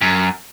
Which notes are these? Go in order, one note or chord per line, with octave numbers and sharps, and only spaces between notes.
F#2